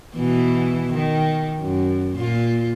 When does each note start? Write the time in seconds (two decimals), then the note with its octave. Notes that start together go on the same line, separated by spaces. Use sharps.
0.16 B2 E3
0.93 D#3
1.60 F#2
2.15 A#2 F4